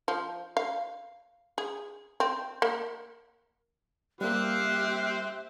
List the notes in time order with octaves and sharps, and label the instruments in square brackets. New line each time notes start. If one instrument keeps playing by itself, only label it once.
[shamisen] F3
F5
G#4
C4
A#3
[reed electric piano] G3 A#3 [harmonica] C4 C5 F5 [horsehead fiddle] G4 E5 [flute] F#6